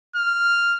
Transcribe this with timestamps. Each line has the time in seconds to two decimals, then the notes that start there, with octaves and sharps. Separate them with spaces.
0.16 F6